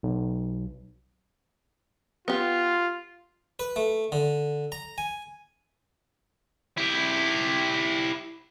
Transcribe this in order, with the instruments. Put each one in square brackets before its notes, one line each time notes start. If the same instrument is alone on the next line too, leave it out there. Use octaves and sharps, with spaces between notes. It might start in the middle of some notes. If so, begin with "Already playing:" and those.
[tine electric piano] B1
[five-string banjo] B3 G4 [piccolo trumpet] F4
[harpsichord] B4
A3
D3
A#5
G#5
[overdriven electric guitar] E4 G4